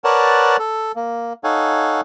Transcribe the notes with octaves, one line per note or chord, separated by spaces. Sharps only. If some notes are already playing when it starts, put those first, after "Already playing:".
A#4 B4 C#5 D5 F#5 A5
A4
A#3
D#4 A4 C#5 F5 F#5 G#5